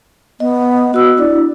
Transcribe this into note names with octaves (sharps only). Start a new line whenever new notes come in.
B3 D#5
B3 F#4 E6
D4 E4 D5